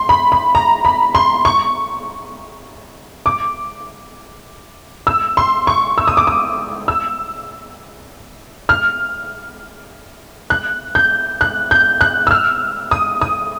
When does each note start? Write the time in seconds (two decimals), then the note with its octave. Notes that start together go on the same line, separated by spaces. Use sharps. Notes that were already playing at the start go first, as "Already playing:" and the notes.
Already playing: C6
0.09 B5
0.32 B5
0.55 A#5
0.85 B5
1.15 C6
1.45 C#6
3.26 D6
5.07 E6
5.37 C6
5.67 C#6
5.98 E6
6.08 D#6
6.17 D6
6.27 D#6
6.88 E6
8.69 F6
10.50 F#6
10.95 G6
11.41 F#6
11.71 G6
12.01 F#6
12.27 E6
12.31 F6
12.91 D#6
13.21 D#6